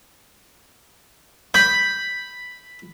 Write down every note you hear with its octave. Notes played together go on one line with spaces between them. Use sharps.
B5 G6